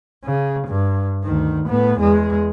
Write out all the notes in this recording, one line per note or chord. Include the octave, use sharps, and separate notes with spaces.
C#3
G2
D2 D#3
A2 B3
E2 G#3